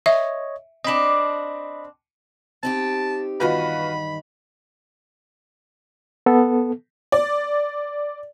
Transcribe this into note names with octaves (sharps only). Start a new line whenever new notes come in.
C#5 D#5 E5
C4 D4 D#5 B5
C4 D#4 G4 A5
E2 G2 D#3 F4 F#4 B4 B5
B3 A4
D5